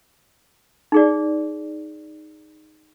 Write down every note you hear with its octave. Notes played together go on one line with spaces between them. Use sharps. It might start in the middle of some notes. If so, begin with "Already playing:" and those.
D#4 G#4 D5